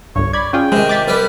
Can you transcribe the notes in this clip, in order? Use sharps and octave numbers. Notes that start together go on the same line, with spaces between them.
G1 C2 G2 C#5
D5 B5 G#6
C#4 F4 G#4 G5
C3 D#3 G#3
D6 A6 B6
C2 G3 B3